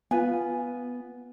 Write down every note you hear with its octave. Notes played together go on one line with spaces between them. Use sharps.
B3 F4 B4 G#5